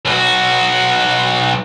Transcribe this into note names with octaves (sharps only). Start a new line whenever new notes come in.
B1 F#4